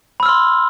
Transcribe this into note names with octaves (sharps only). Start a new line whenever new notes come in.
B5 C6 E6 F6